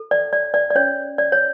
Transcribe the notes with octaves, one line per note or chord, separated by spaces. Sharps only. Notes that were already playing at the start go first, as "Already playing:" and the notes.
Already playing: A4
D5
C#5 D5
D5
D5
C#4 C#5
C#5 D5
C#5